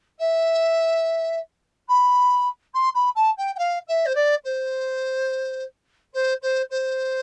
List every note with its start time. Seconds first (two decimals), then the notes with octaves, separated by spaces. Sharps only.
0.19 E5
1.88 B5
2.74 C6
2.94 B5
3.15 A5
3.37 G5
3.55 G5
3.58 F5
3.87 E5
4.05 C5
4.15 D5
4.44 C5
6.13 C5
6.42 C5
6.70 C5